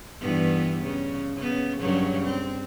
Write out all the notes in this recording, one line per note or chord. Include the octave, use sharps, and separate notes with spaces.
G2 E3 B3
C#3
C#3 B3
G2 C#3 F#3
C4